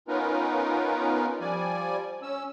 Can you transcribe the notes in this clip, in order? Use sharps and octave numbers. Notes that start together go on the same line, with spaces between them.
B3 C#4 D#4 F4 A#4 B4
F3 G3 D5 G#5
C#4 E6